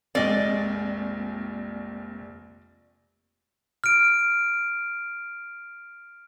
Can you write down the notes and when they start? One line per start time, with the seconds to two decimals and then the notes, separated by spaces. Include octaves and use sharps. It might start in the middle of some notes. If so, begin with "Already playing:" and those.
0.15 F1 A#1 G#3 A#3 C4 D5 D#5
3.84 F6 D7